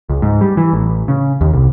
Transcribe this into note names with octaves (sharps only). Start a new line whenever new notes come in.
C#2
G#2
G3
E3
A1
C#3
D#2
C2